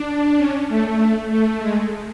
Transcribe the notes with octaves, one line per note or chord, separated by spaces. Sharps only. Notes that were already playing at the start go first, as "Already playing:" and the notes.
Already playing: D4
C#4
A3
A3
A3
G#3